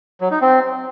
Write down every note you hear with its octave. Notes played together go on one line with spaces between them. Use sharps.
F#3
D#4
C4